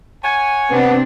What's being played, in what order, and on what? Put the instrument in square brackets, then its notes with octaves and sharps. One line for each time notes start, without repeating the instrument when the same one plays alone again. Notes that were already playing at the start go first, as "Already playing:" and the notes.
[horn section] C#5 F#5 G#5
[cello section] C3 C4 D4 [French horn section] B3